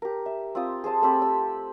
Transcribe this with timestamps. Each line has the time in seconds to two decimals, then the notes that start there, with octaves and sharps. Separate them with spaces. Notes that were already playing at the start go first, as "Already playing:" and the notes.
0.02 G4 A#4
0.26 E5
0.55 C4 F4 D#6
0.84 G#4 C5 A5 D#6
1.02 A3 C4 G4 B5
1.22 E6